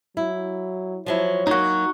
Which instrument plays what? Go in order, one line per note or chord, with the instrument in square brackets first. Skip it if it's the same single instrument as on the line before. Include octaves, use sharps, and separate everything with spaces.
[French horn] F#3 [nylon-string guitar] E4
[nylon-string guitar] F3 F#3 E4 [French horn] C#5
[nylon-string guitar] F#3 A#3 [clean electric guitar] D#4 F#4